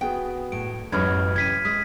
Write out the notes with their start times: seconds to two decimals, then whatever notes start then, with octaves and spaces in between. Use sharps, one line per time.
0.01 B3 F#4 G#4 G5
0.52 A2 D7
0.92 A1 F#2 F#3 G#3 B4 B5 F6 G#6
1.36 C3 G#6 B6 D#7
1.65 G#3 D#6 B6